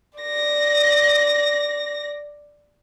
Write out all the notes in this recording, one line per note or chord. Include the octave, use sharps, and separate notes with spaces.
D5 A#6